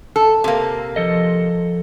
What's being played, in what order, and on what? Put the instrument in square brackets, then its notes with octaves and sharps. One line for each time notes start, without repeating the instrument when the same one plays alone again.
[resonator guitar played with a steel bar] A4
C3 A#3
[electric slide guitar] F3 A4 D#5